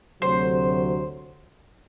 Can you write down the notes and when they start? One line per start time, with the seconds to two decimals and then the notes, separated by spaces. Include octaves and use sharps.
0.22 D2 C3 F#3 C5